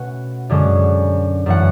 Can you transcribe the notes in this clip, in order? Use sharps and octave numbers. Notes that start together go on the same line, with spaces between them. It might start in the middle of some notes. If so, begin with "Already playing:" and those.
Already playing: B2 A3 C#4 F#5
F#2 D3 G#3 C#4
F#2 E3 A3 F#5